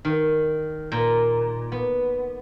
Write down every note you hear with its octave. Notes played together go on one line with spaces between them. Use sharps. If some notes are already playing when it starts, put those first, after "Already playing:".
D#3
A#2
B3